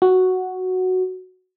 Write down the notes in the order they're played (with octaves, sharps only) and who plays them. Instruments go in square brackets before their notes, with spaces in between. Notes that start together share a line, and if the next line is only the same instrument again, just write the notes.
[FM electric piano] F#4